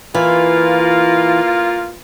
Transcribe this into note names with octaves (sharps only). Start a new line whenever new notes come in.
E3 A#3 F4